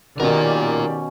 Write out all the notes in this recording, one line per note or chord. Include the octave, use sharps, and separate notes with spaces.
B2 D#3 C#4 F4 G4 A#4 D5